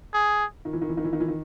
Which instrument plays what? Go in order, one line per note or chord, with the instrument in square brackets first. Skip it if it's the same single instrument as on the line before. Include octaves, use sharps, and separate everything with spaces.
[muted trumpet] G#4
[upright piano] D#3
E3
D#3
E3
D#3
E3
D#3
E3
D#3